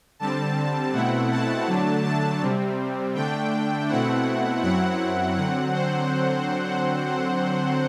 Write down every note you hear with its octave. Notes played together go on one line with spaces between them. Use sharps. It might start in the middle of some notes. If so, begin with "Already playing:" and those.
D3 G3 C4 A5
B2 A3 C4 E4 F#5
A5
D3 F#3 A3 D4
A5
C3 G3 C4
D3 A3 D4 G5
B2 A3 C4 E4 F#5
F#2 F#3 C4 E4 F#5
D3 F#3 C4 F#5
C5